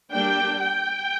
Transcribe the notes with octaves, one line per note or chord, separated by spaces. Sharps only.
G3 A#3 D4 G5
G5